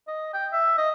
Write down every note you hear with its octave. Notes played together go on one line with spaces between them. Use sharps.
D#5
G5
E5
D#5